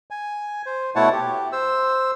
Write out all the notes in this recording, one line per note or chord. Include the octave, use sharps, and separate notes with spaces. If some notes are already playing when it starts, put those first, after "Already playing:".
G#5
C5
B2 A3 E4 C#5 F#5 A5
G4
C5 E6